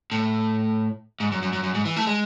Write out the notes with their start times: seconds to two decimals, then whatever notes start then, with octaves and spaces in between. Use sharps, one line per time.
0.12 A2
1.20 G#2
1.32 F#2
1.42 F#2
1.53 F#2
1.63 F#2
1.74 G#2
1.85 E3
1.96 A3
2.07 G#3